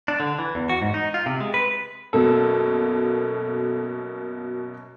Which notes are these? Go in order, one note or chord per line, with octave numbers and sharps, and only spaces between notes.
D4
D3
E3
E2
F#4
G#2
D#4
F4
C3
G#3
B4
F#2 B2 A#3 A4